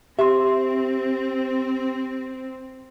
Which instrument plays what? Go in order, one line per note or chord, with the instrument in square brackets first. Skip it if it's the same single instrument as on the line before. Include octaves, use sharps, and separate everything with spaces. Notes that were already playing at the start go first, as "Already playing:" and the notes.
[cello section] C4 [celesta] G4 C6 [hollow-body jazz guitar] E5